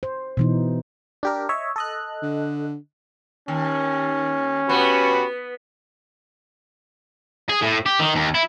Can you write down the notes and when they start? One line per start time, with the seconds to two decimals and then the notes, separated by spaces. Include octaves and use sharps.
0.03 C5
0.37 B2 E3 D#4
1.23 D4 G4 A#4
1.49 C#5 D#5 E5
1.76 A4 D#5 F#6
2.22 D3
3.48 D#2 C#4
4.69 B3 F#4 G4 B4
7.49 G#4
7.62 A2
7.86 G4
8.00 D#3
8.16 D#2
8.35 E4